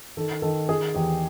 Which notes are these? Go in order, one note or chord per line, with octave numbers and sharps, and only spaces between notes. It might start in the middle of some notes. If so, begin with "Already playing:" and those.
D#3 A4
D#3 A4
D#3 G#4
E2 G4